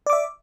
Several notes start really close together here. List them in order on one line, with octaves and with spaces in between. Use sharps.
D5 D6 E5